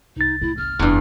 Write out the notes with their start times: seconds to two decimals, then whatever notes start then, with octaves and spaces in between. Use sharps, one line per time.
0.16 C2 D#4 A6
0.41 A2 E4
0.57 G1 F6
0.79 F1 E2 G2